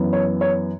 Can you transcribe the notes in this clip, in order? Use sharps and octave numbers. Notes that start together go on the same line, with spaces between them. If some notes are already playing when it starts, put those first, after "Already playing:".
Already playing: F#2 E3 B3
C#5
C#5